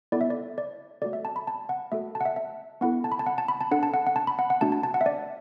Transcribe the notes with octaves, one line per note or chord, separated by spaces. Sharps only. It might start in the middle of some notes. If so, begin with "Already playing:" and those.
B3 E4 A4 D5
E5
D5
D5
A3 F#4 A4 D5
E5
A5
B5
A5
F#5
A3 F#4 A4 E5
A5
F#5
E5
E5
B3 E4 A4 F#5
A5
B5
A5
F#5
A5
B5
A5
D4 A4 F#5
A5
F#5
F#5
A5
B5
F#5
F#5
A3 D4 F#4 A5
A5
A5
F#5
E5
D5